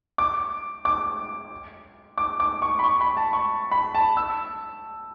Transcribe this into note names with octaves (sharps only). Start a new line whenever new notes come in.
D6
D6
D6
D6
C#6
B5
C#6
B5
A5
C#6
B5
A5
E6